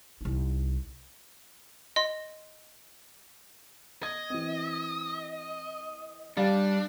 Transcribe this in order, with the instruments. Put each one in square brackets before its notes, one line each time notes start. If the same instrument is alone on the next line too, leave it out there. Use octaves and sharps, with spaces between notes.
[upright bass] C2 D#4
[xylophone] D#5 C6
[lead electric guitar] D#5 [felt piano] G#6
[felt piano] E3 C4
[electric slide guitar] G3 [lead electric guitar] D4 [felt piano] G4 D5 F5